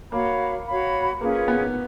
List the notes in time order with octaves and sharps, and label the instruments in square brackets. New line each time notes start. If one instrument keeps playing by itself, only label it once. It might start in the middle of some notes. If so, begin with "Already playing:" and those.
[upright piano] A#3 [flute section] F#4 C#5 F5 B5
[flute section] F#4 C#5 F5 B5
[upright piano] A#3 [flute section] C#4 F4 G#4 B4
[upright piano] B3